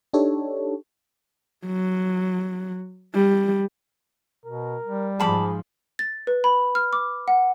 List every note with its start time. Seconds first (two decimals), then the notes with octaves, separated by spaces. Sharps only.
0.13 D4 D#4 G4 A4 C#5
1.67 F#3
3.15 G3
4.46 B2 A#4
4.82 G3
5.20 G#2 F3 G#4 A5 B5 D6
5.99 A6
6.27 B4
6.44 B5
6.75 F6
6.93 D6
7.28 F#5